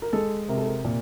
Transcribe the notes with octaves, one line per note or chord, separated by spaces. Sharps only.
A#4
G#3 A4
C3 A#4
A4
A#4
A#2